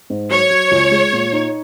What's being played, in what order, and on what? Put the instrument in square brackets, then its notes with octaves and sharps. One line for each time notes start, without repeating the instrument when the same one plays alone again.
[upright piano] G#2
[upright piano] F#3 [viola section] C#5
[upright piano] F#3
C#2
G#3
A#2
D#4